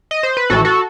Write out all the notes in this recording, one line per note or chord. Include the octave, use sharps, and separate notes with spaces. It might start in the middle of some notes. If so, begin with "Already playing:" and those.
D#5
C5
B4
A1 A2 E3 F#4 A4
F#4 A4